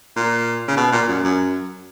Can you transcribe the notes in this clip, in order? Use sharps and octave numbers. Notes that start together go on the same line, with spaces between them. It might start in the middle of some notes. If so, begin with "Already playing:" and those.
A#2
C#3
B2
A#2
F#2
F#2